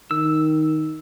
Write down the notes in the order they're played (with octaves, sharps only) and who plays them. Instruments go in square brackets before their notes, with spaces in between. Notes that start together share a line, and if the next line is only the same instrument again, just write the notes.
[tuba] D#3 [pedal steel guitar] E6